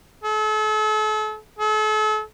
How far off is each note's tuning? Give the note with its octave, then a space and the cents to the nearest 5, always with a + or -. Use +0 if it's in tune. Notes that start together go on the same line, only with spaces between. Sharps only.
A4 -40
A4 -40